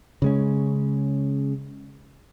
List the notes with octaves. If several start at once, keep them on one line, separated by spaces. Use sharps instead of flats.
C#3 G#3 C#4